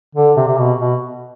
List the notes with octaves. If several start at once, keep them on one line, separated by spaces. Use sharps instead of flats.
D3
C3
C3
B2
B2